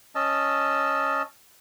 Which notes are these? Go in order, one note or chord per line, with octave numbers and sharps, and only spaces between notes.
C#4 D#5 A5 E6